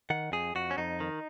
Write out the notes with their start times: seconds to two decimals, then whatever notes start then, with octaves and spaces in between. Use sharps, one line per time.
0.10 D#3 F#5
0.32 F2 G#4
0.55 F2 F#4
0.71 C#4
0.77 F2 D#4
1.00 D#3